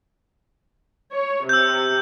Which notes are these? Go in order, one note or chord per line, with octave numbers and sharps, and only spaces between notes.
C#5
C3 E6 G6